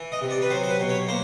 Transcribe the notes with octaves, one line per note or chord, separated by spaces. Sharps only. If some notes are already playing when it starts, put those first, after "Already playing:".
Already playing: E3
D#5
C3
D5
B4
F#3 C5
C5
B4
B2
C#5
A#3 C5